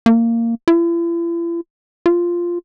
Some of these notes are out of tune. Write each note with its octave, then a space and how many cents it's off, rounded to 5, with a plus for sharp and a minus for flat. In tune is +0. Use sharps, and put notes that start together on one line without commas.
A#3 -15
E4 +45
F4 -5